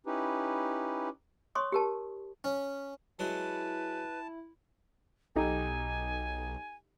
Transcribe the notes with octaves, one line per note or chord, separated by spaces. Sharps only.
C#4 D#4 E4 G4 B4
C#5 C6 C#6 D#6
G4 A#4 A5
C#4
F#3 G#3 E4 F#4 B4 A5
B1 D#4 G4 A4 G#5